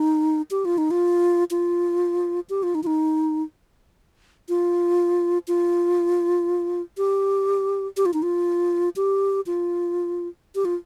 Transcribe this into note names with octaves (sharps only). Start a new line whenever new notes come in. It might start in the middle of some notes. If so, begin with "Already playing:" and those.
Already playing: D#4
G4
F4
D#4
F4
F4
G4
F4
D#4
F4
D#4
F4
F4
G4
G4
F4
D#4
F4
G4
F4
G4
F4